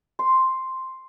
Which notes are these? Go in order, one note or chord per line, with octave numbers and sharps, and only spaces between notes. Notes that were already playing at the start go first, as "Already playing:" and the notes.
C6